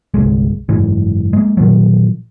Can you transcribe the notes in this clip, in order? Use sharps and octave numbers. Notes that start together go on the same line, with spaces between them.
G1 C2 G#3
F#1 G#2 E3
G#3 A#3
A#2 D#3 F3 F#3